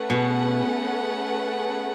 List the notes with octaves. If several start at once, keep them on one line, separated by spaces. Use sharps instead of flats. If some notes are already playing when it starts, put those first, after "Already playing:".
Already playing: A3 C#4 G#4 B4 F#5
B2